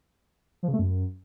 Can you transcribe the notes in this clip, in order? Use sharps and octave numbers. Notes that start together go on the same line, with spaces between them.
F3
C#3
A3
F#2